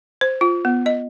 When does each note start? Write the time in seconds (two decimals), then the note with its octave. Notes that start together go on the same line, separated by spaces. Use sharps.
0.21 C5
0.41 F4
0.65 B3
0.86 D#5